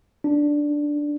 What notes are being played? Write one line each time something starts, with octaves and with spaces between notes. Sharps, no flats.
D4